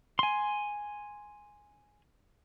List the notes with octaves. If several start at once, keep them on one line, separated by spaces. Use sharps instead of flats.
G#5 C6